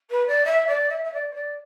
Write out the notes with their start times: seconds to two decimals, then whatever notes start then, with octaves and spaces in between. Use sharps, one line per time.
0.10 B4
0.27 D5
0.44 E5
0.66 D5
0.89 E5
1.03 E5
1.12 D5
1.31 C#5
1.34 D5